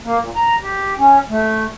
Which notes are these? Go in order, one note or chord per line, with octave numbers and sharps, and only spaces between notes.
A#3
A#2
A#5
G4
C#4
A3